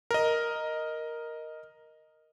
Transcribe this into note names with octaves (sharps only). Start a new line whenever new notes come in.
A#4 D#5